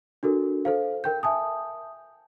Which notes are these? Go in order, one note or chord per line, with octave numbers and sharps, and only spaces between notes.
D4 F#4 A4 A#4
A4 C5 F5
A#4 G5 G6
E5 G#5 A5 D#6